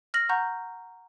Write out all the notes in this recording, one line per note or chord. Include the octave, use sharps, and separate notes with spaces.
F6 A#6 F#7
F#5 A#5 C#6 G6